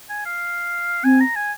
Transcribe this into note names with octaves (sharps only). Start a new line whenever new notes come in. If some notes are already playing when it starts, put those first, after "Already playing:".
G#5
F5
C4 G#5
A#5
G#5